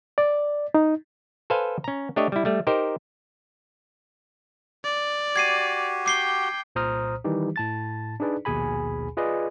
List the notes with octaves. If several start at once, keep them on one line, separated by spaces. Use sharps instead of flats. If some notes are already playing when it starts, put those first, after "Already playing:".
D5
D#4
A4 B4 C5 F5 G#5
C#4 A#5
A3 D4 G4 C#5 D#5
G3 E4
G3 A3
D#4 G4 A#4 C5
D5
F#4 G4 G#6 C7 D#7
G5 D6 C7 G7
C2 A#2 C5 A#5 D#6 F6
D#3 E3 G3 D#4 G4
A2 A5 A6
D4 D#4 G#4 B4 D5
A#1 D#2 B2 G#4 G#5 B5
F4 G#4 B4 D5 D#5